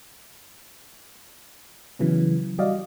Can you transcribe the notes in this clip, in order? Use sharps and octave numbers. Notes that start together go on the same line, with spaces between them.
C#3 E3 F#3 B3
G3 F#4 D5 D#5 F5